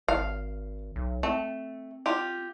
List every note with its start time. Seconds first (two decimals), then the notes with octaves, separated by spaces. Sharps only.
0.08 G#1 F5
0.96 B1
1.23 A3 C4
2.06 F4 G4